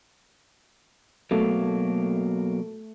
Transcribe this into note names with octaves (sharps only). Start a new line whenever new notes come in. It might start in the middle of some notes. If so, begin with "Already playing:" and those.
B2 F#3 A3 A#3